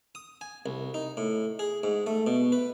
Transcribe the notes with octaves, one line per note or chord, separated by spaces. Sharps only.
D#6
G#5
C2
D#4
A2
G#4
G#2
A3
B2
B4